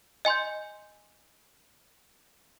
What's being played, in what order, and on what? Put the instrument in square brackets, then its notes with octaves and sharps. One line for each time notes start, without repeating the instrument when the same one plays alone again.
[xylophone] D#5 G#5 C6 G6